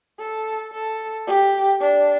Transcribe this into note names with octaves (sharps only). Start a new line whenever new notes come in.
A4
A4
G4
D4